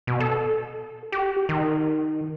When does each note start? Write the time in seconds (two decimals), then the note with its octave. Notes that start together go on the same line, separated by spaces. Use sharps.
0.07 B2
0.20 A4
1.12 G4
1.49 D#3